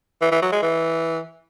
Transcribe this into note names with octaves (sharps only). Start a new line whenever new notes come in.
E3
E3
F#3
G#3
E3